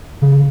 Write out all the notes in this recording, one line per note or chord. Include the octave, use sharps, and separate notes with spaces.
C#3